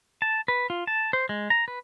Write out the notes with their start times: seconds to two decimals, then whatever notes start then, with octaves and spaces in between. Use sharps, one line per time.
0.22 A5
0.48 B4
0.70 F4
0.87 A5
1.13 C5
1.29 G#3
1.50 A#5
1.68 B4